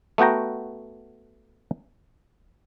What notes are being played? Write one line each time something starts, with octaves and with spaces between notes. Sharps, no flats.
A3 B3 F#4 G5 A#5